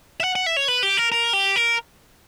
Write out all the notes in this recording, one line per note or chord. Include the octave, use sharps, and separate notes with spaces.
E5
F#5
F#5
E5
C#5
B4
G4
A#4
A#4
G4
A#4